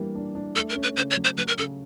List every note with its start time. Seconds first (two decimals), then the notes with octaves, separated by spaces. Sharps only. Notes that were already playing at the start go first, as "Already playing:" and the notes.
Already playing: E3 G3 A#3 D4
0.15 D4
0.35 D4
0.55 A3 A4
0.70 A#4
0.76 C#4
0.83 B4
0.96 C#3 C5
1.11 C#5
1.17 F#3
1.24 C5
1.37 F#3 B4
1.48 A#4
1.58 C#3 A4